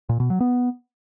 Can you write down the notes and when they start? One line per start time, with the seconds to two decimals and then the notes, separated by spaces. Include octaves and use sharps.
0.09 A#2
0.20 B2
0.30 F#3
0.40 B3